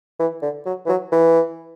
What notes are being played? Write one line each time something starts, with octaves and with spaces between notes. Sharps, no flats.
E3
D3
F#3
E3
F#3
E3